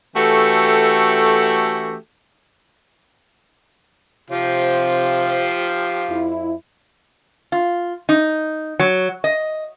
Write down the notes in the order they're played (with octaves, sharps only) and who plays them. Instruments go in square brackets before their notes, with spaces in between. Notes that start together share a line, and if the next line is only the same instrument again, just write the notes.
[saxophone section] E3 A3 C#4 F#4 G4 A4
[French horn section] C3 C5 [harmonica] F3 F4 G4
[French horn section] F2 E4
[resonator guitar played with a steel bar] F4
D#4
F#3
D#5